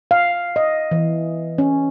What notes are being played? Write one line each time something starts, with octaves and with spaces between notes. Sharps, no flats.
F5
D#5
E3
C#4